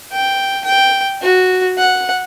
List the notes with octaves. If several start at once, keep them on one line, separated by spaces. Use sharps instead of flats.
G5
G5
F#4
F#5